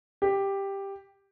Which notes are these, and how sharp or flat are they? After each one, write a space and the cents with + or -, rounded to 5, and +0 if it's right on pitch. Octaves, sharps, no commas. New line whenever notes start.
G4 +5